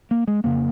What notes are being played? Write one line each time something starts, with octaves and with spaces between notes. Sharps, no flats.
A#3
G#3
F2 C#3 A#3